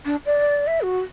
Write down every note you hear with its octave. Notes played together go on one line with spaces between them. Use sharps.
D4
D5
E5
F#4